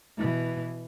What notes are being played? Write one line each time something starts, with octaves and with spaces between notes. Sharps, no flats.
B2 E3